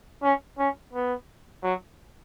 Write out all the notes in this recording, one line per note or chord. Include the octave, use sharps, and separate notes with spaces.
C#4
C#4
B3
F#3